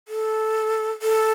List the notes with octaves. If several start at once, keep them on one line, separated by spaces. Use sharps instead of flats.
A4
A4